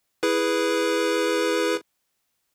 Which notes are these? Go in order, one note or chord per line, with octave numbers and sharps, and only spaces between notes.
E4 G#4 B4